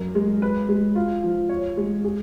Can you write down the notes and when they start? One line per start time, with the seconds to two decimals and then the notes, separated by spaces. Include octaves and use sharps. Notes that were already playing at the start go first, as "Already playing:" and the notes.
Already playing: F#2 A#4
0.15 G#3
0.42 B4
0.69 G#3
0.95 F4
1.23 F3
1.49 C#5
1.77 G#3
2.04 G#4